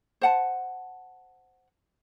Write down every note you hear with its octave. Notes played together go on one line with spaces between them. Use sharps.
C5 F#5 A5